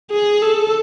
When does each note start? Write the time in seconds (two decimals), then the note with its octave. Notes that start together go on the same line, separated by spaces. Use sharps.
0.10 G#4
0.42 A4